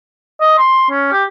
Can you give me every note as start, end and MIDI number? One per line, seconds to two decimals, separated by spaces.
0.40 0.55 75
0.58 0.86 84
0.91 1.08 61
1.12 1.24 67